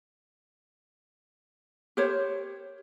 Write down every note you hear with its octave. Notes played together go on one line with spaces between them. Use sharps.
G4 A#4 C5 C#5